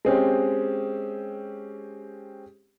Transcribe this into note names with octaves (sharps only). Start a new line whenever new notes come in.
G#3 C4 C#4 G4